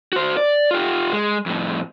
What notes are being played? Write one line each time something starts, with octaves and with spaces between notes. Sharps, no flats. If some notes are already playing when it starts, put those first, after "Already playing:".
F#4 C5
D5
F4 G4
G#3
F2 A2